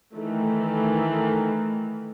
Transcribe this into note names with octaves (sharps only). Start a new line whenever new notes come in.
D#3 E3 A3